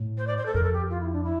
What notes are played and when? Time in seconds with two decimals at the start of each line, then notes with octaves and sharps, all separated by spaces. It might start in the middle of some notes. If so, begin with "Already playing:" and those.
Already playing: A2
0.17 C5
0.27 D5
0.37 C5
0.45 A4
0.54 F2 A#4
0.63 A4
0.73 G4
0.89 F4
1.00 E4
1.12 D4
1.23 E4